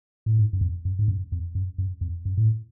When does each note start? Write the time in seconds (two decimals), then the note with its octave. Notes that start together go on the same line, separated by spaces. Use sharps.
0.26 A2
0.39 G#2
0.53 F#2
0.61 F2
0.85 F#2
0.99 G#2
1.08 F#2
1.32 F2
1.55 F#2
1.78 F#2
2.01 F2
2.25 F#2
2.37 A2